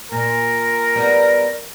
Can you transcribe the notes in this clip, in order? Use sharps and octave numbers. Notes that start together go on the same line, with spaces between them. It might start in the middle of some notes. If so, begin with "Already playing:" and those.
A#2 A#4
G3 B3